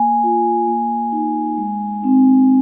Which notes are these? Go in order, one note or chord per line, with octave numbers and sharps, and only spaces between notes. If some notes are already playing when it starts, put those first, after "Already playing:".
Already playing: A#3 G#5
F4
A#3
D#4
G#3
C4 D#4